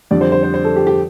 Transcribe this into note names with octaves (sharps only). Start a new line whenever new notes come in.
F2 D3 G3 D5
C5
C5
C5
C5
A4
G4
G4